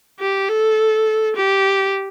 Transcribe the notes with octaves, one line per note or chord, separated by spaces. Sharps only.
G4
A4
G4